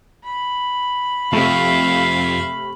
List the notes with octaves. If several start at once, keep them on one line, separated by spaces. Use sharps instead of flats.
B5
F2 C3 A3 E5 F5